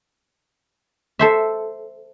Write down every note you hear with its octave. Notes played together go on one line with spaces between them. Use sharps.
A4 C5 E5